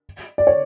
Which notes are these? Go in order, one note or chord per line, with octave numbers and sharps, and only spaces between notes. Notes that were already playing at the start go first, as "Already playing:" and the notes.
D5
C#5